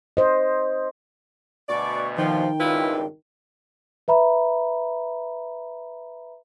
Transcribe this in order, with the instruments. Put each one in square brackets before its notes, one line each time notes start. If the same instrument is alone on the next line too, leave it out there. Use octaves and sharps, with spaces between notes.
[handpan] C5 D#5
[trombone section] D2 B2 [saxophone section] D5 [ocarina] C#6
[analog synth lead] D#3 [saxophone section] F3 [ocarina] G5
[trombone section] G#1 C#2 G2 [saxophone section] E4 F4 B4
[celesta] B4 E5 A#5 B5